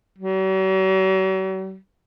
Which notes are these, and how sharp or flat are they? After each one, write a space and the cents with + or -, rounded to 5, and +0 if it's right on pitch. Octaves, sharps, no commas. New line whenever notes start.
F#3 +45